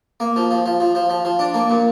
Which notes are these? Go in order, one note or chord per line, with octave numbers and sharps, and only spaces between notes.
A#3
F3
F3
F3
F3
F3
F3
F3
D4
A#3
A#2